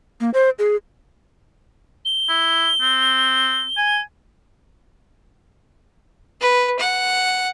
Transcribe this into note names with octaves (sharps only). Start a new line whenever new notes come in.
A#3
C5
G#4
G7
E4
C4
G#5
B4
F#5